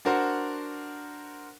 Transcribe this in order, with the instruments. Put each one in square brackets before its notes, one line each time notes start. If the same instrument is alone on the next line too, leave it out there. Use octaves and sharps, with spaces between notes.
[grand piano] D4 F#4 A#4 C5 F#5 C6